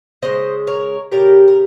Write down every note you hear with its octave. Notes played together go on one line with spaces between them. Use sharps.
C#3 G#3 C5 D#5
A#4 C#5
C#3 G3 G4 A#4
A#4